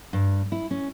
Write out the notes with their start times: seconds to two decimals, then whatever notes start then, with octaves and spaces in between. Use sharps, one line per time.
0.13 G2
0.52 E4
0.71 C#4